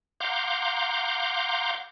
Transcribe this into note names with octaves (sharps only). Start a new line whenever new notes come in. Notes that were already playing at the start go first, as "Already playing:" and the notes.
F5 F#5 A#5 C6 D6 G6